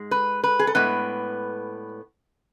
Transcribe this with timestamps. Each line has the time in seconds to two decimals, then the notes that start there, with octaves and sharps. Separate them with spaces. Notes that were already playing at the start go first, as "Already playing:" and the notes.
Already playing: G#2 G#3
0.11 B4
0.44 B4
0.59 G#4
0.67 A4
0.74 A2 G#3 B3 D4 B4